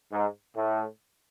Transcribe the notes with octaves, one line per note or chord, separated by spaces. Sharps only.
G#2
A2